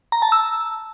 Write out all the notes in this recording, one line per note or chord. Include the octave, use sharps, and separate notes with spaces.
A#5
A5
E6